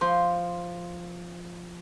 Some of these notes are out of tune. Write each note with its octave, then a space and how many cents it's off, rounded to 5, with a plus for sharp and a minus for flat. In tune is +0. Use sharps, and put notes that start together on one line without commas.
F3 +0 C5 +0 C6 +0